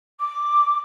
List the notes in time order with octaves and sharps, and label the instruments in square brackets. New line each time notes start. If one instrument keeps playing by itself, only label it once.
[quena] D6